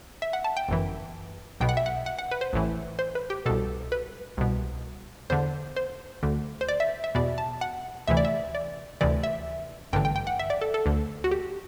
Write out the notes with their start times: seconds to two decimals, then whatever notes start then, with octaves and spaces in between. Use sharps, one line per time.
0.22 E5
0.33 F#5
0.44 A5
0.57 G5
0.68 G1 F#2 E3
1.60 B1 B2 G5
1.69 F#5
1.77 E5
1.86 F#5
2.06 F#5
2.19 F#5
2.31 B4
2.41 C5
2.53 A1 A2 E3
2.99 C5
3.15 B4
3.30 G4
3.46 C2 B2 A4
3.92 B4
4.37 C2 B2
5.30 E2 D3 C5
5.76 C5
6.23 D2 D3
6.61 C5
6.68 D5
6.80 E5
7.04 E5
7.15 E2 B2 D5
7.38 A5
7.61 F#5
8.08 D2 C3 E3 E5
8.17 D5
8.25 E5
8.55 D5
9.01 D2 C3 E3 D5
9.23 E5
9.93 A1 G2 D3 G5
10.05 G5
10.16 G5
10.27 F#5
10.39 E5
10.50 D5
10.61 A4
10.74 A4
10.86 D2 D3
11.24 F#4
11.31 G4